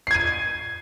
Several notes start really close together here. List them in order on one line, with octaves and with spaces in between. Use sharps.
C7 G#6 D#7